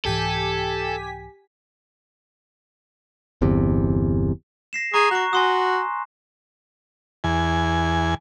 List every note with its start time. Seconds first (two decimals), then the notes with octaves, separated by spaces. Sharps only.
0.05 C2 G#2 E3 G4 A4 G#5 B6
3.42 G1 E2 C3
4.73 A#6 C7 E7
4.94 G#4 A#5 C#6
5.11 F#4 C#6 F#6
5.33 F#4 G#5 C6 D#6
7.24 E2 G#5